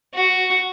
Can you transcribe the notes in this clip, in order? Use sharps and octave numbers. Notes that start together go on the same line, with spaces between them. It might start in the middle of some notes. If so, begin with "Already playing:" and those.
F#4